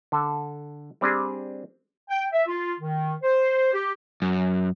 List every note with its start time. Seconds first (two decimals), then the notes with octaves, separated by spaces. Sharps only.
0.12 D3 A4
1.01 G3 C4 D4 G4 G#4
2.09 G5
2.32 E5
2.47 F4
2.80 D#3
3.21 C5
3.72 G4
4.22 F#2